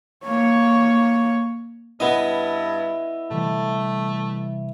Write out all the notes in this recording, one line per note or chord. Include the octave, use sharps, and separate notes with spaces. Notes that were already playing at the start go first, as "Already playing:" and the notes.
A#3 C#5
G2 B3 E4 D#5
C3 E3 G3 A3